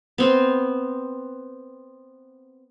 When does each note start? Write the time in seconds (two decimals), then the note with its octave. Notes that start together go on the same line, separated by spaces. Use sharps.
0.18 B3 C4